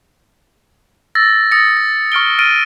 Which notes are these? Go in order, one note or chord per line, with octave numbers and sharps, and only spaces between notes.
E6 A6 A#6
D#6 A6 A#6 C#7
A6
C#6 F6 D7 G7
F6 A6 D7 D#7